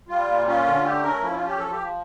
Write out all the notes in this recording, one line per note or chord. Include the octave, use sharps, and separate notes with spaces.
G3 F4
A#2
C#4 F4
D3
A3 G4
C#4 A#4
F3 E4
F4
C#4
G4
F3 A4
G4
F3